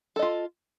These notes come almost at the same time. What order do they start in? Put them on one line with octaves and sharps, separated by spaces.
A4 D#5 F4